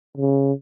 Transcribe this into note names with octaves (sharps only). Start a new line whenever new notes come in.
C#3